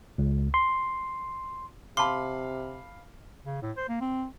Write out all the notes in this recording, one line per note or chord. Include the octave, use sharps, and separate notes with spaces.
C#2
C6
C3 F5 A5 B5 C6 D6
C#3
A2
C5
A#3
C4